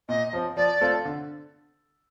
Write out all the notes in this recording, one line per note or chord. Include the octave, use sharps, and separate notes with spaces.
A#2 D#5
F3 C4
F3 D5
A3 C4 F4 A4
D3